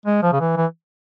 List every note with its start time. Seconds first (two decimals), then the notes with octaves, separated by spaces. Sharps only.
0.06 G#3
0.23 F3
0.32 C#3
0.40 E3
0.57 E3